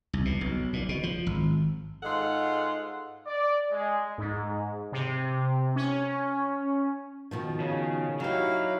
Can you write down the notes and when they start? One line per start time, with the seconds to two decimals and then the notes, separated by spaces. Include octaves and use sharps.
0.13 C2
0.25 B2
0.41 B1
0.73 A#2
0.89 B2
1.03 F3
1.26 G#1
2.03 G#2 G#3 F4 A4 F#5
3.27 D5
3.71 G#3
4.18 G#2
4.92 C3
5.76 C#4
7.31 B2 D#3 F3
7.60 C#3
8.20 F#3 D#4 E4 G4 F5